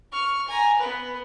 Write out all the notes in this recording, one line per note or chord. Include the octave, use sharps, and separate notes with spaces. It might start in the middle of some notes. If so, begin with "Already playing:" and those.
C#6 F6
G#5 A#5
B3 B4